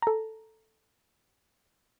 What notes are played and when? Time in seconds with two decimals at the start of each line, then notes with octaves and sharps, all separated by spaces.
0.02 A4 A#5